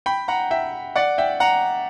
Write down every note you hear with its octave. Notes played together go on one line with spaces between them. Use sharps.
G5 B5
F#5 A#5
E5 G5
D5 F#5
E5 G5
F#5 A#5